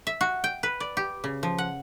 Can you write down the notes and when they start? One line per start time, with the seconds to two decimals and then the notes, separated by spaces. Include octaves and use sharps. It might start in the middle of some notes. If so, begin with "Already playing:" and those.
0.07 E5
0.21 F#4
0.44 G5
0.63 B4
0.80 D5
0.97 G4
1.24 C#3
1.43 F3
1.58 F#5